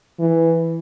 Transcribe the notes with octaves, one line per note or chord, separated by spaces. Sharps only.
E3